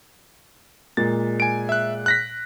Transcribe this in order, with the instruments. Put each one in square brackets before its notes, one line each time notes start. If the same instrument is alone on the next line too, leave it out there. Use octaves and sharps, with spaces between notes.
[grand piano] A#2 G#3 A#3 [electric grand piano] A6
[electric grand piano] G#5 D7
E5 F#6
F#6 A#6 B6